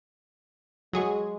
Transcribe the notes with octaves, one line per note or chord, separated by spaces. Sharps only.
F#3 G#3 G#4 C#6